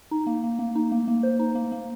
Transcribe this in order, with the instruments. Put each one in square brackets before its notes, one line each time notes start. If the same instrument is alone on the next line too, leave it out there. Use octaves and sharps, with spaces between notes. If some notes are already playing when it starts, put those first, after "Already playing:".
[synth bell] D#4
A#3
A#3
A#3
D#4
A#3
A#3
C5
D#4
A#3
A#3